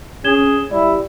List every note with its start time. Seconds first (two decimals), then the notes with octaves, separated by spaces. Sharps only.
0.24 C#4 G#4 G#6 E7 G7
0.71 G3 E4 D5